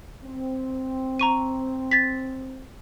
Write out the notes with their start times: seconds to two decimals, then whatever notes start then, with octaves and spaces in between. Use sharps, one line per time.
0.24 C4
1.19 A#5 C#6 D#7
1.91 A6 B6